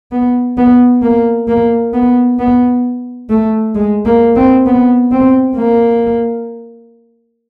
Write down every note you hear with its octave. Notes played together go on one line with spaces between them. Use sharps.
B3
B3
A#3
A#3
B3
B3
A3
G#3
A#3
C4
B3
C4
A#3